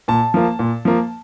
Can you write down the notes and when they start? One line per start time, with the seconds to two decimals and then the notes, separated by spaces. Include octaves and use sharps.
0.08 A#2 A5
0.34 F3 A#3
0.59 A#2
0.85 F3 A#3